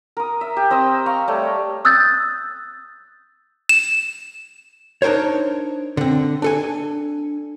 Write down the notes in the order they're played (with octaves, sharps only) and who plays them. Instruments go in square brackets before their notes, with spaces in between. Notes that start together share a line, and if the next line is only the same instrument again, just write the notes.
[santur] A#4 D#6
E5
G4
C4 D#5 D#6 E6
F5 A#5 C#6
G3 A3 C#5
[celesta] D#6 E6 F#6 G6 A6
[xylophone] E7
[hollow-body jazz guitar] D4 D#4 A#4 C5 C#5
D3 C4
D4 A4 G#5